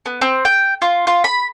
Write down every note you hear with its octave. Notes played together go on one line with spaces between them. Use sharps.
B3
C4
G5
F4
F4
B5